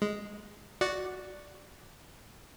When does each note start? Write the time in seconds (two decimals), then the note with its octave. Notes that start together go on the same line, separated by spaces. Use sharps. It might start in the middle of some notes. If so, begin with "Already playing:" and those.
0.02 G#3
0.81 F#4 D5 F#5